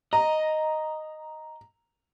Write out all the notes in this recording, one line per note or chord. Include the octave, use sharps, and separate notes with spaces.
D#5 A#5